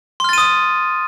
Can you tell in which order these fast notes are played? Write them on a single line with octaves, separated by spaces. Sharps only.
C6 F6 A6 D#7 D#6